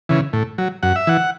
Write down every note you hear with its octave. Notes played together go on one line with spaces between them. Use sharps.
C#3 E3
A2
F#3
F#2 F#5
E5
E3 F#5